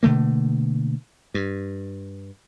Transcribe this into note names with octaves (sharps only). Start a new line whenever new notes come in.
B2 D3 A3 A#3
G2